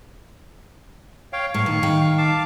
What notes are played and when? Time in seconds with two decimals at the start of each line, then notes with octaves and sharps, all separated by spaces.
1.33 C#5 F5 G5
1.54 A2 F5 C#6
1.66 D#3
1.83 D#3 G5
2.01 F5
2.18 F5 A5 D6